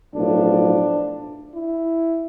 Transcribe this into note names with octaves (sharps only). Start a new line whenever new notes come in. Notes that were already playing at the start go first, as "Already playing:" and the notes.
B1 A2 F3 D4
E4